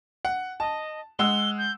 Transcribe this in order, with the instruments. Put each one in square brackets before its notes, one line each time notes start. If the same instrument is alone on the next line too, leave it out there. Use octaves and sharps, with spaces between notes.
[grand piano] F#5
[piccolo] D#5 [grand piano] A5
[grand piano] G#3 F#5 E6 [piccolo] G7
[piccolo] G6